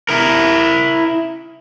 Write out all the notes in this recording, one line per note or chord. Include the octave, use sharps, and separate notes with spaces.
E4 A#4